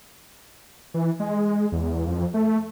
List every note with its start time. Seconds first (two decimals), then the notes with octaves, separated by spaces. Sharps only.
0.94 E3
1.20 G#3
1.72 E2
2.07 F2
2.34 A3